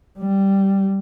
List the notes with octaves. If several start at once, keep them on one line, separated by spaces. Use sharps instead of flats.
G3